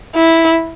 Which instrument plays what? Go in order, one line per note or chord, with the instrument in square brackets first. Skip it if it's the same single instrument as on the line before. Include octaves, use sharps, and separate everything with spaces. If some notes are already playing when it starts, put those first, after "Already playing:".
[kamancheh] E4